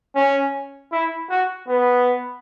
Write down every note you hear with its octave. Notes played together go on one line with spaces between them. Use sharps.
C#4
E4
F#4
B3